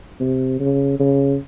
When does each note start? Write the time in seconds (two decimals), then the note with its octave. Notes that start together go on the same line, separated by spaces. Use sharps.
0.20 C3
0.60 C#3
1.00 C#3